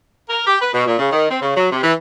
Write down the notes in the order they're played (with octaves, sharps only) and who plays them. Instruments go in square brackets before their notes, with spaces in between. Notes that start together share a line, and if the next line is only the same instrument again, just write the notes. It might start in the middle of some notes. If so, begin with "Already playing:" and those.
[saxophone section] A#4
G4
B4
B2
A#2
C#3
D#3
C4
C#3
F#3
C3
E3